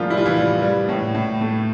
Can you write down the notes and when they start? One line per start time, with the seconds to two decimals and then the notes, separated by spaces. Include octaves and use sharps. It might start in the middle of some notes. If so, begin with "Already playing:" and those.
Already playing: D3 F3 G3 A3 A#3 F4 G4 G#4
0.10 G3 E4
0.17 F4
0.26 E3 E4
0.37 G3
0.62 G3
0.89 A2
1.15 A2
1.41 A3